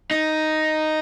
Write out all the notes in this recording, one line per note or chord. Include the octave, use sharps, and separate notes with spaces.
D#4